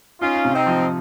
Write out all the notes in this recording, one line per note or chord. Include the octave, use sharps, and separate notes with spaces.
C#4 D#4 F4
C3
C4 D#4
F3